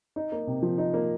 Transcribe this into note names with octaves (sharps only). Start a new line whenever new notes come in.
D#4
A#3
C3
F3
D#4
A#3